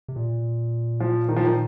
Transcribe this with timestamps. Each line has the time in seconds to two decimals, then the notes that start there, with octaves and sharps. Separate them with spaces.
0.08 C3
0.16 A#2
1.00 F3
1.29 D#3
1.36 F3
1.44 D#3